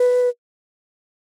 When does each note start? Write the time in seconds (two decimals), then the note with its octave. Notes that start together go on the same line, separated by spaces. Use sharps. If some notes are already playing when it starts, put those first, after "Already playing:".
Already playing: B4